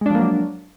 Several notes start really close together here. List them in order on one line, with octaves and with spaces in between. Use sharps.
G#3 D4 F3 A#3 F#3